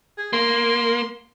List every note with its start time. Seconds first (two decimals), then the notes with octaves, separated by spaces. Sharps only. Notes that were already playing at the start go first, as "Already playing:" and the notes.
0.18 G#4
0.33 A#3 C6